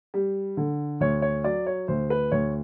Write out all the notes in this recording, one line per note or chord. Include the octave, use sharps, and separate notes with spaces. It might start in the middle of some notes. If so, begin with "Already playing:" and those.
G3
D3
D2 C#5
C#5
F#3 D5
C#5
D2 C5
B4
D2 C#5